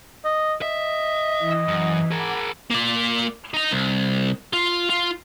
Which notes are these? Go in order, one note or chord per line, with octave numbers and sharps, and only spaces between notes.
D#5
D#5 E5
E3
F#2
G#4 A#4 F#5 B5 D6
A#3 D5
D#4 A#5
C2
F4
F4